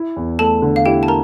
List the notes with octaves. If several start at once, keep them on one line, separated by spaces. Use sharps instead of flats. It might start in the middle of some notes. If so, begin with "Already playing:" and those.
Already playing: E4
E2
A3 A4 A5
D3
F5
E4 G4 G5
A5
A#4 A#5